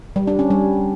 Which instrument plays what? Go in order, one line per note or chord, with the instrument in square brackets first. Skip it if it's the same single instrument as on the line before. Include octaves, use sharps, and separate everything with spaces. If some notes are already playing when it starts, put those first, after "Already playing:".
[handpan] G3
D4
C#4
G3